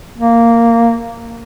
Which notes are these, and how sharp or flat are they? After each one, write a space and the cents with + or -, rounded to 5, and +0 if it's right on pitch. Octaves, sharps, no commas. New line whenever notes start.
A#3 -10